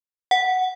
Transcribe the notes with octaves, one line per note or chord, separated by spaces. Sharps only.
F#5